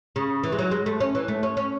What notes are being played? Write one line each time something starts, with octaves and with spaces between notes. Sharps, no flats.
C#3
E3
G#3
F#3
G#3
A3
C#4
E3
A3
C#4
C#4